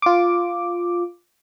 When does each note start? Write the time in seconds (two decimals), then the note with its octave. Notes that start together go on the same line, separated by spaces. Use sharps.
0.02 F4 D6